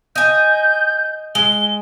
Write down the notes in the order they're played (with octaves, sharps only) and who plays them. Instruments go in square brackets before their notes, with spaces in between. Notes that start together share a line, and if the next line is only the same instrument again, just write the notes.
[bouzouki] D#5 G#5 [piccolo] G6
[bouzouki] G#3 [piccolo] G7